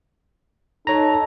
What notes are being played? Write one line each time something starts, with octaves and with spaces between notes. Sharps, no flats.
D#4 A4 C#5 A#5